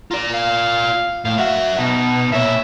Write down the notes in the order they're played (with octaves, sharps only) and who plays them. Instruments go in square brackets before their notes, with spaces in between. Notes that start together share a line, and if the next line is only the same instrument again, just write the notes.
[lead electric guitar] F4 D5 [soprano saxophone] A#5
[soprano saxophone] F5
[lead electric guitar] A2 [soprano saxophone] F5
[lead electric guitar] F#2 E5 [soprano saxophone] F#4
[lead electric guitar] B2 [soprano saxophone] D#4
[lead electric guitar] A#2 C#5 [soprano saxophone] E5